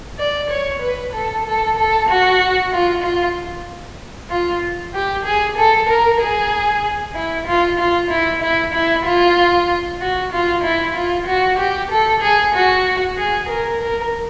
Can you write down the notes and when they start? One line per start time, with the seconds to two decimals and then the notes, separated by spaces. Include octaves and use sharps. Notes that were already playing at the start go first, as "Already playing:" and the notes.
0.19 D5
0.50 C#5
0.82 B4
1.13 A4
1.46 A4
1.78 A4
2.09 F#4
2.73 F4
3.03 F4
4.30 F4
4.94 G4
5.25 G#4
5.58 A4
5.89 A#4
6.21 G#4
7.15 E4
7.47 F4
7.79 F4
8.11 E4
8.42 E4
8.74 E4
9.05 F4
10.01 F#4
10.33 F4
10.64 E4
10.96 F4
11.27 F#4
11.59 G4
11.91 A4
12.22 G#4
12.55 F#4
13.17 G#4
13.49 A#4
13.81 A#4